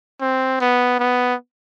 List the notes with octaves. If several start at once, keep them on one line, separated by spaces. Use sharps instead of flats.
C4
B3
B3